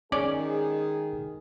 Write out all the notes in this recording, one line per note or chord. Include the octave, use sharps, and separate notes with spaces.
D#3 G#3 C#4 G#4 D5